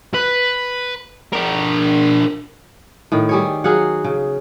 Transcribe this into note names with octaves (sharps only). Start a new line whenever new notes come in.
B4
D4 A#4
A2 D#3
G3 G#4 C#5
F#3 G#4 F5 F#5
C#3